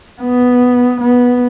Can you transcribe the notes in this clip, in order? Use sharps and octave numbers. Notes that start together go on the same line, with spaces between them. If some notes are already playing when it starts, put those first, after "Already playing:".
B3
B3